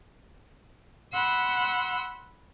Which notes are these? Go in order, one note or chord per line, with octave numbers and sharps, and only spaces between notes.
F#5 B5 C6 E6